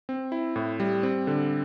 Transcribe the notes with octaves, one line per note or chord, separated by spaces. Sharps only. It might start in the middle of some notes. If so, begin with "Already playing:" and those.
C4
E4
A2
G3
C4
D3